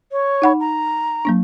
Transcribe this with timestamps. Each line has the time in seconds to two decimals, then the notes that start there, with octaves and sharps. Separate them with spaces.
0.12 C#5
0.42 D#4 F#5 B5
0.60 A#5
1.25 F#3 A#3 D4